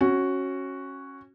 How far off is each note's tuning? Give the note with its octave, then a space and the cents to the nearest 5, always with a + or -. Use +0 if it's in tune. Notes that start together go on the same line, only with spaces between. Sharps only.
C#4 -20 F#4 +0